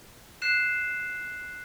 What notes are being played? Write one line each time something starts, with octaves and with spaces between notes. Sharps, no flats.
F#6 C7 E7